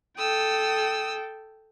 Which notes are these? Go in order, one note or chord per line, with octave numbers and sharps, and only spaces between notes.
A4 G5 D#6 E6